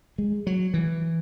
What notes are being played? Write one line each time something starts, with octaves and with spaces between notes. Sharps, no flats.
G#3
F#3
E3